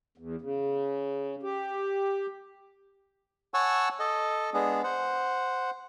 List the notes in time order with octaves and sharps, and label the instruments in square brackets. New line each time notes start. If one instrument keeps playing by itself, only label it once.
[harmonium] E2
C#3
G4
[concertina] C#5 F#5 G#5 A5 C#6 E6
A4 D#5
G#3 B3 D4 G#4
C5 F#5